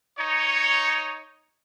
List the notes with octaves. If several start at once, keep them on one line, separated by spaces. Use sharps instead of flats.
D#4 C#5